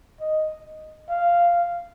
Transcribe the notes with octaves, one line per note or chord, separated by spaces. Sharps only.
D#5
F5